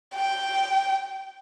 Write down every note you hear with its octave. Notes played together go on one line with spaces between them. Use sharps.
G5